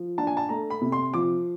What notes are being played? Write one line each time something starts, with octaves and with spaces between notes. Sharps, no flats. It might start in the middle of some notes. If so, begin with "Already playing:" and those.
Already playing: F3
D4 A5
G#5
A5
A3 A#5
B5
C3
C6
F3 D6